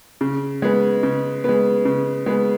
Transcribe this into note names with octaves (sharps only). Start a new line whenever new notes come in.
C#3
G#3 B3
C#3
G#3 B3
C#3
G#3 B3